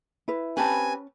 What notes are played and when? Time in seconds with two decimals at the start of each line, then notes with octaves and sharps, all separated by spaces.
0.28 E4 B4
0.57 C4 C#4 G4 B4 G#5 A5